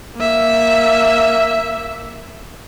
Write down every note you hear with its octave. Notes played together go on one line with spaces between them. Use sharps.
A#3 E5